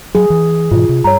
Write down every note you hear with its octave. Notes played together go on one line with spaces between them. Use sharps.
F#3 G#4
E3
G#2 B2 E3 F4
C3
G2 C#5 A#5